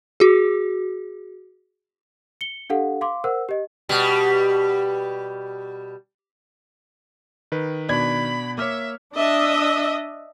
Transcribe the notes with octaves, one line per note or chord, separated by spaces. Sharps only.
F#4 G#4
C#7 G7
D4 G4 A4 F5 F#5
F5 C6 D6
A#4 C5 F#5 E6
G4 D#5
B2 G3
D#3 B4
B2 D4 B5 G#6
A#3 C#5 E5 D6 F6
D4 D#5 E5